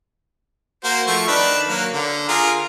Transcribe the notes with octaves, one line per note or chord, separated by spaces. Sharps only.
A#3 F#4 C5
F3 A3 C#6
D#3 D4 B4
F#3 A#3
D3
F4 G#4 A#4